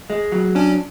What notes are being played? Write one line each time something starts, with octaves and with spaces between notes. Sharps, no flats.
G#3
F#3
C#4 D4